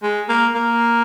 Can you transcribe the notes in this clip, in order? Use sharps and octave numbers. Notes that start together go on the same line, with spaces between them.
G#3
A#3
A#3